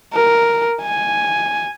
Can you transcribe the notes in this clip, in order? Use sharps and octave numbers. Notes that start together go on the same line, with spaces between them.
A#4
G#5